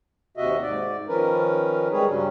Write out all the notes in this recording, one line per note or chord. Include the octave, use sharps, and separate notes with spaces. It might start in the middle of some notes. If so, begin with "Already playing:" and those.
D#2 C3 F#4 D#5 E5
G#2 D5
D#3 F3 C#4 A#4 B4
G3 G#3 C4 G#4 B4 C#5
G2 C#3 F#3 G3 C#4